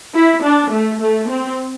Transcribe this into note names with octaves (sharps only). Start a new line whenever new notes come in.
E4
D4
A3
A3
C4